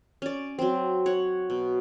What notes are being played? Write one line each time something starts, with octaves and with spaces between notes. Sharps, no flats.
C#4 D5
F#3 C4
C#5 F#5
B2